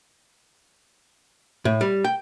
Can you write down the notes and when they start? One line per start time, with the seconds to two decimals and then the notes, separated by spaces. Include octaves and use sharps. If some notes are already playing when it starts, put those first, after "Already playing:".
1.65 A2
1.81 G3
2.04 G5